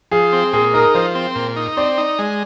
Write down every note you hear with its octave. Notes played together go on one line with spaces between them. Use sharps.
F3 G#4
C4
A#2 G#4
D#4 A#4
F3 C5
C4
A#2
D#4
C4 D5
D#4
G#3